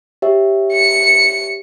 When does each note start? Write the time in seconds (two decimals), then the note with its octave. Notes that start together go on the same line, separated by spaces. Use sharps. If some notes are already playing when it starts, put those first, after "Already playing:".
0.22 G4 C#5 E5
0.73 C#7